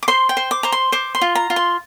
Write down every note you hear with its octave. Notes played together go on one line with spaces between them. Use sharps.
D6
C5 C6
G5
C5
D6
C5 A#5
C6
C5 D6
C6
F4
A#5
F4
C6